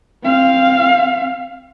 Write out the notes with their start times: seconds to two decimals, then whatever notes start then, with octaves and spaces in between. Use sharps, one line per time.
0.24 C4 F5